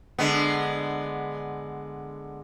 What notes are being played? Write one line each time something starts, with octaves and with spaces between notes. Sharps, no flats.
D3 G#3 B3